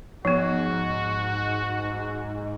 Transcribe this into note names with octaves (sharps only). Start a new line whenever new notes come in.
G#2 F3 B3 F#4